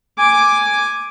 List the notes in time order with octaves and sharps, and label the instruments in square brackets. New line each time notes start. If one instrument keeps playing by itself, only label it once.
[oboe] G#5 [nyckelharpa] D6